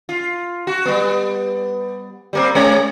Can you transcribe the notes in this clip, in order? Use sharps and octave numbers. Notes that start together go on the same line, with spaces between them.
F4
F#4
G3 B3
G3 A#3 C4
G#3 C#4 C#5